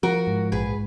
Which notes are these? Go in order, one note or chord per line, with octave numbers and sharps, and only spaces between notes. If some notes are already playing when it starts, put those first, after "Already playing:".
F3 F#4 A#4
G#2
A#1 G#4 B4